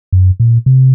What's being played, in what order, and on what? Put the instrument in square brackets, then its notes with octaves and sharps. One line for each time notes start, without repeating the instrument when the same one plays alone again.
[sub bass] F#2
A#2
C3